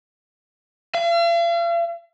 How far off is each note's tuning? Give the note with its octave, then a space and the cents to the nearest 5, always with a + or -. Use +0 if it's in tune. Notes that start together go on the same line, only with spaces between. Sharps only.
F5 -45